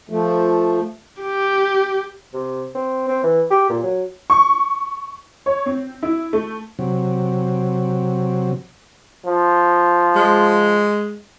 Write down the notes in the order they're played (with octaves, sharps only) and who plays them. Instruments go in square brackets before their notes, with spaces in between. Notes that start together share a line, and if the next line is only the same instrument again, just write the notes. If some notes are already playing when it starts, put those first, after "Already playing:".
[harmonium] F3 A3
[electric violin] G4
[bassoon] C3
C4
C4
E3
G4
A#2
F#3
[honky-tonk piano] C#6
C#5
C4
E4
A3
[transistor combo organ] C3 F#3
[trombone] F3
[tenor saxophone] G#3